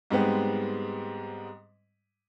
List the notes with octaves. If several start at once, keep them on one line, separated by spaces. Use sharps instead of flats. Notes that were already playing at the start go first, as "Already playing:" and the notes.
G#2 G3 G#3 B3 C4